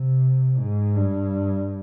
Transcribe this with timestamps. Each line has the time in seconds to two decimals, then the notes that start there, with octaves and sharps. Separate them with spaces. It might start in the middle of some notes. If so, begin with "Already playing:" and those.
Already playing: C3
0.58 G#2
0.97 G2